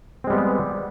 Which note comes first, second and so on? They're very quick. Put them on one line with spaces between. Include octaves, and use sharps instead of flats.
C4 G#3 G3 B3